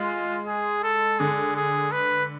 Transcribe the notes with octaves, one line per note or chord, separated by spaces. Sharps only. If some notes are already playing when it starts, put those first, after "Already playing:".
Already playing: G#3 F4
G#4
A4
D3 G#4
G#4
B4